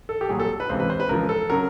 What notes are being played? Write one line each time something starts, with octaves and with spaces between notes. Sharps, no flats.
A4
G4
C2 A#2 F#3 G#4
A4
B4
C#2 C3 E3 C5
B4
C5
B4
C#2 C#3 F3 A#4
A4
C#3 F#3 A#4